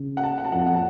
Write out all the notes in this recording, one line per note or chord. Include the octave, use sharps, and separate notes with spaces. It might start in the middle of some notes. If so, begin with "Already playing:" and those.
Already playing: C#3
F#5
A5
F#5
A5
F2 F#5
A5
F#5
A5